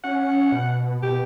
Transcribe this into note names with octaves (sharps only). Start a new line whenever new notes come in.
C#4 F#5
B2
B2 G4